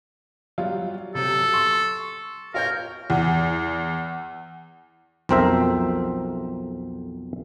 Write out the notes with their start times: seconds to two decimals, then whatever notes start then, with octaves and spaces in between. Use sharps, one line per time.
0.58 F#3 G3 F4
1.15 C3 F#3 A4
1.54 C6 C#6
2.54 F4 A#4 C#5 G6
3.10 E2
5.29 B1 F2 C4 A#4 C5 E5